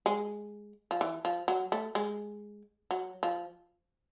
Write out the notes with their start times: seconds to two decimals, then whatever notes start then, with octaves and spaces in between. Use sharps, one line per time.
0.06 G#3
0.91 F3
1.01 E3
1.25 F3
1.48 F#3
1.72 A3
1.95 G#3
2.91 F#3
3.23 F3